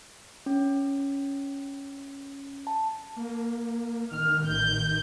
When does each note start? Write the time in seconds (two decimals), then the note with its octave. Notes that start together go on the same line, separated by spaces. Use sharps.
0.46 C#4
2.67 A5
3.16 A#3
4.12 D#3 F6
4.44 A1 G6